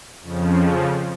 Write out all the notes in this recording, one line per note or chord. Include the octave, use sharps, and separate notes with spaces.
F2 C#3 F3